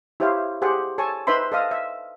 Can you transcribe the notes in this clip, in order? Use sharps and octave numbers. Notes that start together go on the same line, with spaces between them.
E4 G4 C5 C#5 E5 F5
G4 G#4 C5 F#5
A4 C#5 G#5 A5 C#6
D#4 B4 C5 E5 B5 C6
A4 D#5 F5 D#6
E5